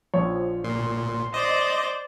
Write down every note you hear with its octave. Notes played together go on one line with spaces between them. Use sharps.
A#1 F3 C#5
A#2 C6
C5 D5 D#5